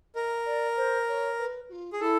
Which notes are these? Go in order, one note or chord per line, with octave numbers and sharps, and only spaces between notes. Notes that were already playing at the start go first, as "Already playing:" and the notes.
A#4 D#5
D5
C5
C#5
B4
F#4
F4
G#4
E4 A4